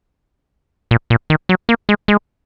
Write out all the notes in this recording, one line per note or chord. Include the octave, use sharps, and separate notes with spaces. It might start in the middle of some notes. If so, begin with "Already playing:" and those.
A#2
A#2
D#3
F#3
A#3
G#3
G#3